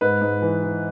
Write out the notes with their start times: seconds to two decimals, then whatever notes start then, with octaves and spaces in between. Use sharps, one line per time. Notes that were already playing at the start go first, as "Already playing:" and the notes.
0.01 G#2 B4
0.21 G#2
0.42 E3
0.63 E3